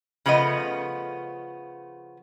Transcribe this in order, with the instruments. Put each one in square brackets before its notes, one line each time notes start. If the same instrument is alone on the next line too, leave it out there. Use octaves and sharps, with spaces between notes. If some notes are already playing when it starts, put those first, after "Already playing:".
[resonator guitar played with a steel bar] C#3 F3 A3 B3 D#5